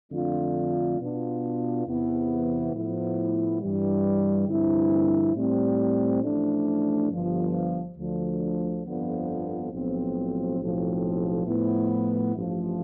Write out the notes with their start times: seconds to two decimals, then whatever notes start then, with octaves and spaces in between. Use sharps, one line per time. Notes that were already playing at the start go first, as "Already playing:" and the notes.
0.12 F2 D3 A3 D4 F4
0.99 B2 B3 D4 F4
1.87 E2 C3 E3 B3
2.74 A2 F3 B3 E4
3.61 G2 E3 G3
4.48 G2 D3 F3 C4 E4
5.35 A2 G3 C4
6.23 A1 A2 F3 A3 D4
7.11 G1 G2 F3
7.98 D2 D3 F3
8.85 G1 F2 D3 F3 B3
9.73 B1 A2 F3 C4
10.60 B1 A2 F3 C4
11.47 A2 F3 B3 E4
12.34 A1 G2 F3 A3